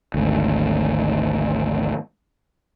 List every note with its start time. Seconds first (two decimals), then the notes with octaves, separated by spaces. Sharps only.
0.14 G#1 D2